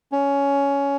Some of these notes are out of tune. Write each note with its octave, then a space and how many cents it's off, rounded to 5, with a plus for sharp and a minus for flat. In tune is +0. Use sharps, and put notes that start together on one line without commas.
C#4 +15